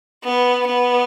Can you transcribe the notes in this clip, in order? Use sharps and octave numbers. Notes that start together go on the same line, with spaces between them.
B3
B3